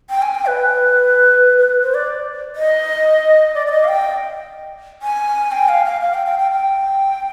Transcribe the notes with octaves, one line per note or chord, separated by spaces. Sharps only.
G5
G#5
G5
B4
B4
C5
D5
D#5
D5
D5
D#5
F5
G5
G#5
G5
F5
F5
F5
G5
G5
G5
G5